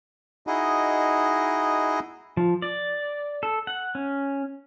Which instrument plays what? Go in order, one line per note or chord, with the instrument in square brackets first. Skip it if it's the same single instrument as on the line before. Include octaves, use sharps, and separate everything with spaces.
[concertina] D#4 E4 F#4 G#4 D#5
[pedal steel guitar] F3
D5
A4
F#5
C#4